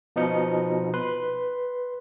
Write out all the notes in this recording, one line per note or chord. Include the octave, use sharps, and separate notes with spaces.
B2 F3 D#4 C#7
B4 C6